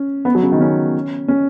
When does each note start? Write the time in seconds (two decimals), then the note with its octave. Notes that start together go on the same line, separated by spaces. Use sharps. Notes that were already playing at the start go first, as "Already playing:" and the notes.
Already playing: C#4
0.25 B3
0.35 F#3
0.42 C#3
0.52 D#3
0.61 C#4
1.28 C#4